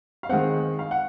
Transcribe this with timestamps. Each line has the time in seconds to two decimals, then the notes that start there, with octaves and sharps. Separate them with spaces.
0.23 F5
0.29 D#3 G#3 C4 F#5
0.79 F5
0.91 F#5